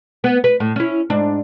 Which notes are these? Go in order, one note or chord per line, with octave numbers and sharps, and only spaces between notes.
B3
B4
A2
C#4 E4
G#2 D4